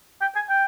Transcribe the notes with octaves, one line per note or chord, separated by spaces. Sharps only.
G5
G#5
G5